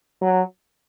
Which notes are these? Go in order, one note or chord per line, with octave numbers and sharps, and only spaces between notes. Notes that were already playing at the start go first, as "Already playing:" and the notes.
F#3